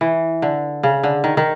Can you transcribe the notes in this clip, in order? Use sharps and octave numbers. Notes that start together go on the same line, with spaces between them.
E3
D3
C#3
D3
D#3
D#3